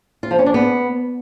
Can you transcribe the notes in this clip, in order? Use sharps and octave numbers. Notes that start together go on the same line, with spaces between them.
F4
F3
C#4
D4
B3